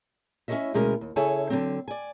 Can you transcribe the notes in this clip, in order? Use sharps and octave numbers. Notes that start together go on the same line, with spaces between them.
C#4 E4 G#4 C#5 D#5 E5
D2 B2 G#3 C#4 A#4
D#2
C#3 E4 G#4 A4 C#5 G#5
D3 F#3 C4
D5 G#5